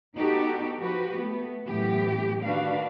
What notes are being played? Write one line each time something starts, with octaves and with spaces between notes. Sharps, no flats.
B3 D#4 F#4 G4 A4
F3 F#4 G4 B4
A3 B3
F#2 A2 E3 B3 G4
D#3 D4 F#4 B4 F5